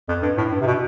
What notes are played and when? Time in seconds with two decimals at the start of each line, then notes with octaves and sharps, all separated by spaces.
0.09 F2
0.23 G2
0.38 A2
0.52 G2
0.61 C3
0.67 B2